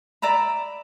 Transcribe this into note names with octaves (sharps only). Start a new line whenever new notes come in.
D5 E5 A#5 B5